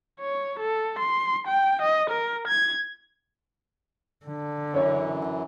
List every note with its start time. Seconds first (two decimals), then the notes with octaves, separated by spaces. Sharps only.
0.20 C#5
0.59 A4
0.99 C6
1.47 G5
1.82 D#5
2.10 A#4
2.48 G#6
4.26 D3
4.74 F#2 E3 C#4 C#5